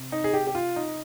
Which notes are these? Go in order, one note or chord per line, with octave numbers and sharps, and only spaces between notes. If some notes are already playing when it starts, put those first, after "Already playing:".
Already playing: C3
D#4
G#4
G4
G4
F4
D#4